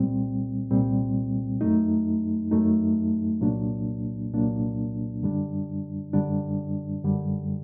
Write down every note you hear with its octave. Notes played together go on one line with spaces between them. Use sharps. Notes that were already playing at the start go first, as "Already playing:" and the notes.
Already playing: C2 A#2 G3 C4
C2 A#2 G3 C4
F#2 F#3 A3 D#4
F#2 F#3 A3 D#4
C2 A#2 F#3 A#3 D4
C2 A#2 F#3 A#3 D4
F#2 D3 G3 D4
F#2 D3 G3 D4
F#2 D3 G3